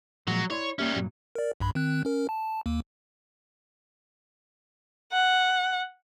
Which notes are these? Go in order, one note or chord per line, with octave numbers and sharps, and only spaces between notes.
A#2 F3 F#3 G#3 F#4
E4 C#5 D5 C6
G3 A#3 C#4 G4 E5
G2 A#2 F#3
A#4 D5
B1 G2 B5
D#3 C4 F#6
C#4 A#4
A5
D#2 A#3
F#5